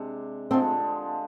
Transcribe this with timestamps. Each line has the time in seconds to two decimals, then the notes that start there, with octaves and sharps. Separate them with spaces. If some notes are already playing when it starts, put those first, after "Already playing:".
Already playing: C3 G#3 D4
0.51 D3 F3 G#3 C4